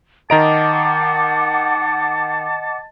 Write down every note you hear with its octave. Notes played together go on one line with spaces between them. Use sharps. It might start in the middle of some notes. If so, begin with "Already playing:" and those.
D#3 D#5 F#5 A5 A#5 D6 D7